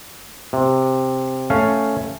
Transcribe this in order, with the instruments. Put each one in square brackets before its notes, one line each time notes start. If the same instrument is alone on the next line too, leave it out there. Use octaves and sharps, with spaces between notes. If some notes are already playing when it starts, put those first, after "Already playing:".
[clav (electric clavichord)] C3
A3 C#4 F5